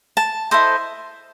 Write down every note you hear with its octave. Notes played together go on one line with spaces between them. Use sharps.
A5
E4 A4 C5 D#5